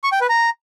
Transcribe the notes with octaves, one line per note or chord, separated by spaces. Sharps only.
C#6
G5
B4
A#5